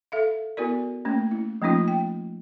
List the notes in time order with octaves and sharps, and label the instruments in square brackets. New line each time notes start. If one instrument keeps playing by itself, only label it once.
[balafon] A4 E5 F5
B3 E4 F#4 A#4 D5
A3 A#3 C#4
E4
F3 A3 A#3 C#4 D#4 F4
G5